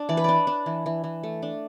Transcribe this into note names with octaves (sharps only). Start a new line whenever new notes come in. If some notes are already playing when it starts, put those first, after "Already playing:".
Already playing: D4
E3 D5
B4
D4 D5
D4
E3
E3
E3
A3
D4